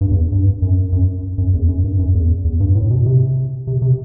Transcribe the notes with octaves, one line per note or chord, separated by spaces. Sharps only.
G2
E2
G2
F#2
F#2
F#2
E2
F#2
G2
F#2
E2
E2
G2
A2
B2
C3
C3
C3